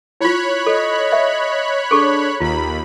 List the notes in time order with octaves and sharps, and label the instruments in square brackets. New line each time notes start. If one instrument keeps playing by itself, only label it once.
[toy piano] E4 F4 [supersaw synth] C#5 B5 F#6
[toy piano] A4 [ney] D#5
[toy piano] E5
[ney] D4 [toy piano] G#4 A4 C#6
[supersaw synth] D#2 B5 [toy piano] F4 [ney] A#5